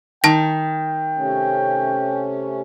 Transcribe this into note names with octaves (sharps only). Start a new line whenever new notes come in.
D#3 G5 A5 A#6
C3 A3 C#4